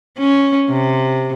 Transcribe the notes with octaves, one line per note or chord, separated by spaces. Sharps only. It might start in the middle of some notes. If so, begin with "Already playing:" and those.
C#4
C3